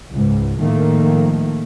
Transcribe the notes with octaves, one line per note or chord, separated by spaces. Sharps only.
C#2 G#2
A2 D#3 F3 A3 A#3